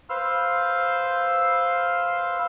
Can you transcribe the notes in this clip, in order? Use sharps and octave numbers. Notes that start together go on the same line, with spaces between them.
B4 C5 F5 C6 E6 F6